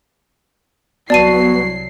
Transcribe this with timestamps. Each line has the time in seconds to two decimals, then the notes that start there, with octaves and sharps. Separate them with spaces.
1.10 C2 F#3 B3 F#4 D5 A5 C7 D#7